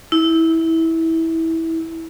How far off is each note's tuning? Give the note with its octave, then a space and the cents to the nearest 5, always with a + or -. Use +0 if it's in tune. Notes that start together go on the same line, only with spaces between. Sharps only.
E4 -20